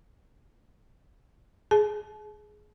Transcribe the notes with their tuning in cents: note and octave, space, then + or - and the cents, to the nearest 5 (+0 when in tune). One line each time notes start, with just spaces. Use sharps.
G#4 +15 A5 -40